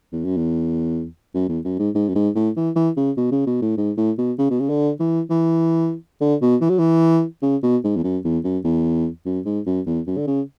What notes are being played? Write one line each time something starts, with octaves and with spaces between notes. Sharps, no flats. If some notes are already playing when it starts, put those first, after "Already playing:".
E2
F#2
E2
F#2
E2
F#2
G#2
G#2
F#2
G#2
A2
E3
E3
C#3
B2
C#3
B2
A2
G#2
A2
B2
C#3
B2
C#3
D3
E3
E3
D3
B2
E3
F#3
E3
C#3
B2
G#2
E2
F#2
E2
F#2
E2
F#2
G#2
F#2
E2
F#2
D3
C#3